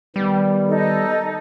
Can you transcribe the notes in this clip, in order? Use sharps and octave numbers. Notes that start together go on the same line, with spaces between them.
D#3 G3 B3
D#4 A4